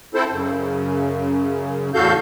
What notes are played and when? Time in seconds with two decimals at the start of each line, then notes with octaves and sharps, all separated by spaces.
0.14 C4 E4 A4 C5
0.30 F#2 C#3
1.94 E2 A2 F#4 A4 F5 G6